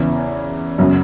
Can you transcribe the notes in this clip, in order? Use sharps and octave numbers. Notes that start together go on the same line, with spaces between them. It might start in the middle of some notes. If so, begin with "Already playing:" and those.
Already playing: E2 C#3 E3
F#2 C#3 F#3